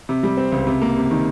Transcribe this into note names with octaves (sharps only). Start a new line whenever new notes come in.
C3
G3
C4
C#2
C3
A#3
C3
D#3